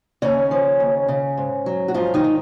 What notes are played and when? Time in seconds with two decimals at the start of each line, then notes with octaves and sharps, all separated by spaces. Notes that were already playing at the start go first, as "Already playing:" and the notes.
0.22 D#2 C#3 C#4
0.51 F3
0.80 D#2
1.08 C#3
1.38 G#2
1.66 F#3
1.88 F#4
1.94 G#2 F3 F4
2.14 D#3 D#4
2.24 D#3